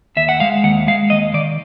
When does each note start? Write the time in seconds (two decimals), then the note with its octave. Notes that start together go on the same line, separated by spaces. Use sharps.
0.17 D#2 E5
0.29 F#5
0.40 G#3 F5
0.64 D#2 F#5
0.87 G#3 F5
1.10 D#2 D#5
1.34 D#3 D5